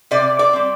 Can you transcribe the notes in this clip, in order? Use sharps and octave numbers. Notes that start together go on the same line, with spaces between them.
C3 D5
D5
G3 C4